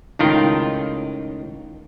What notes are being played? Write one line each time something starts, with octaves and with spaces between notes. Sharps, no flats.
C#2 A2 D#3 F4 A#4 G5